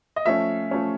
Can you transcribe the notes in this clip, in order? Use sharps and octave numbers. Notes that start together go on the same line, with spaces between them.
D#5
F3 A3 C#4 E5
F3 A3 C#4